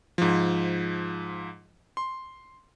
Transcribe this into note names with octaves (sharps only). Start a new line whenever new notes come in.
G#2 F3
C6